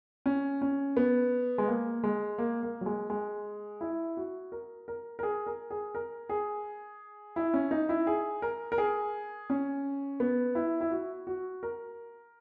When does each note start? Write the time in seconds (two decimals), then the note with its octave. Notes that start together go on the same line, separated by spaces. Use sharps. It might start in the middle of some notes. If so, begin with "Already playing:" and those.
0.26 C#4
0.62 C#4
0.97 B3
1.58 G#3
1.68 A#3
2.04 G#3
2.38 A#3
2.63 A#3
2.81 F#3
2.86 G#3
3.10 G#3
3.81 E4
4.17 F#4
4.52 A#4
4.88 A#4
5.19 A#4
5.23 G#4
5.47 A#4
5.70 G#4
5.95 A#4
6.29 G#4
7.36 E4
7.54 C#4
7.71 D#4
7.89 E4
8.07 G#4
8.42 A#4
8.72 A#4
8.78 G#4
9.50 C#4
10.20 B3
10.55 E4
10.81 E4
10.91 F#4
11.27 F#4
11.63 A#4